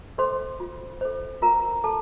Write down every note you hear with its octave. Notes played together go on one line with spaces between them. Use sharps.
A4 C5 C6
F4
A4 C5
F4 A#4 A#5
A4 A5